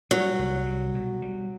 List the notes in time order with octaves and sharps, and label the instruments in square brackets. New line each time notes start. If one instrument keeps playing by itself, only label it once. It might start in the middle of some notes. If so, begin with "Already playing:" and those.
[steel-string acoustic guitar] F#3 [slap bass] G3
[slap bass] C2
G3
B2
G3